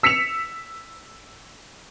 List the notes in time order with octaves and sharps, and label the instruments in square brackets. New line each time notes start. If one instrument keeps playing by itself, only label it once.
[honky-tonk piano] E6 B6 C#7 E7 F7